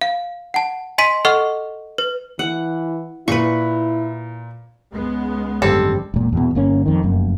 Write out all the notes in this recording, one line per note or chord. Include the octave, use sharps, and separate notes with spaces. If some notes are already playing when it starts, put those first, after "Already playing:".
F5
F#5 A5
D#5 G#5 C6 B6 D#7
A4 D#5 F#5 C#6 F6
B4
E3 F#5
A#2 E4 B4 C#6
C#2 G#3 B3
G#1 F#2 D3 G3 C4 G4 A4 C5
E1 A#2
E2 B2
G1 A#3 C#4
F2 D#3
F1 F#2 A#3